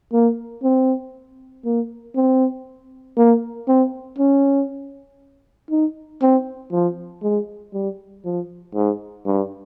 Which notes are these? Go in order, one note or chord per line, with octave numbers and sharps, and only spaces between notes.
A#3
C4
A#3
C4
A#3
C4
C#4
D#4
C4
F3
G#3
G3
F3
G#2
G2